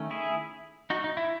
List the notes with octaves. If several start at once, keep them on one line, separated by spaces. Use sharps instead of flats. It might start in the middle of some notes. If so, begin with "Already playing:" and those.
Already playing: D#3 A3 C#4
E4 G#4
D#4 F#4
D#4
E4